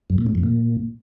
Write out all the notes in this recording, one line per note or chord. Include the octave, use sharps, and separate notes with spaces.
F#2
A#2
A2
F2
A#2